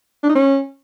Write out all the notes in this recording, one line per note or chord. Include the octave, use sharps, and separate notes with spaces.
D4
D#4
C#4